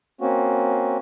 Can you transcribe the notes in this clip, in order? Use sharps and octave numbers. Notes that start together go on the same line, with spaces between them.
A#3 C4 C#4 F#4